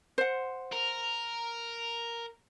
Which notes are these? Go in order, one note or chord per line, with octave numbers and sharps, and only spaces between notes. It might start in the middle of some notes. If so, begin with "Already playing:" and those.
C5 F#5
A#4